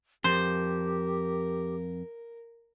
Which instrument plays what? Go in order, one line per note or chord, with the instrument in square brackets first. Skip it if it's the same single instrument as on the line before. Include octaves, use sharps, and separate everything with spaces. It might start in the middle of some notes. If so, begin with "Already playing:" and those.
[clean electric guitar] F2 [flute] G4 [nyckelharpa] A#4 [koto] C5